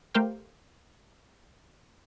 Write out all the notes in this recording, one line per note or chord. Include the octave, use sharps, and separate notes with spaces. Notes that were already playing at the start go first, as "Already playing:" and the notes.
A3 G4 A#4 C5 F5 G5